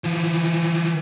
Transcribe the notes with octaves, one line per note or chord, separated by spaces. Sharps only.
E3 F3